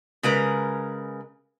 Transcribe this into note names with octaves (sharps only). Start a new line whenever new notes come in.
C#3 G#3 A#4 B4